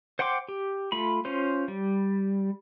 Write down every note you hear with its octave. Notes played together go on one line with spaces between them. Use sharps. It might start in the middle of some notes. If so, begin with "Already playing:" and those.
C5 F#5 G5 C6 D6
G4
A3 F4 B5
C#4 F4 C5
G3